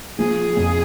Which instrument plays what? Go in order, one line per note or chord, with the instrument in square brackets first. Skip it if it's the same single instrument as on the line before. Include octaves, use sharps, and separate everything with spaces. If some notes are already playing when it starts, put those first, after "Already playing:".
[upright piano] F3 [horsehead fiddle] G#4
[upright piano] F2